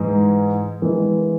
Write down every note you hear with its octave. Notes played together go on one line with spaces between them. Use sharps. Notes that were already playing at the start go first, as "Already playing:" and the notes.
Already playing: G#2 E3 G#3
E3 G#3